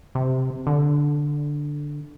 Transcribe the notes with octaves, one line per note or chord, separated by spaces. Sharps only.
C3
D3